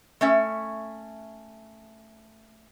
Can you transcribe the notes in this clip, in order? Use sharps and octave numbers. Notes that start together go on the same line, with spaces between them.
A3 C#4 E5